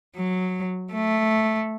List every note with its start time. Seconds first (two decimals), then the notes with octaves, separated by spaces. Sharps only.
0.15 F#3
0.93 A3